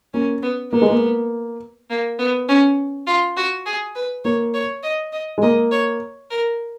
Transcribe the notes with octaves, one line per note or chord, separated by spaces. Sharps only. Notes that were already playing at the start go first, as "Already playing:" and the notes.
A#3 C#4
B3
A#3 B3
G#3
A#3
A#3
B3
C#4
F4
F#4
G#4
B4
A#3 C#5
C#5
D#5
D#5
G#3
A#3 D#5
C#5
A#4